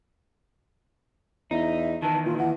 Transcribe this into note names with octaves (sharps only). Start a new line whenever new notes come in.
E2 D#4 E5
D#3 E3 A5
A#2 F4
D#2 E3 F#5